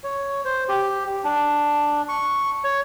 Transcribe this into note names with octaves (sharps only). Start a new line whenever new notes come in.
C#5
C5
G4
D4
C#6
C#5